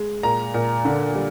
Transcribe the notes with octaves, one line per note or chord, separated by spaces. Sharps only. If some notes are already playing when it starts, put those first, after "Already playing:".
Already playing: G#3
A#2 A#5
A#2
D3
G3